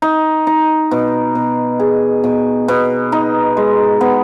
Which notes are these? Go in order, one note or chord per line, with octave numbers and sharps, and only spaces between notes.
D#4
D#4
B2
B2
G#4
B2
B2
D#4
G#3
B3